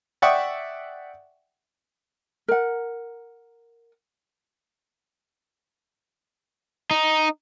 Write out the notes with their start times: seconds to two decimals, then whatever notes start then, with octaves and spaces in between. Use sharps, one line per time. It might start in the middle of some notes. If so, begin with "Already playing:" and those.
0.22 D5 E5 F#5 G5 C#6 D#6
2.48 A#4 F#5
6.91 D#4